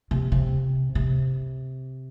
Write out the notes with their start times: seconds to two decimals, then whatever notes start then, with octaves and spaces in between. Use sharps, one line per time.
0.11 C3
0.32 C3
0.95 C3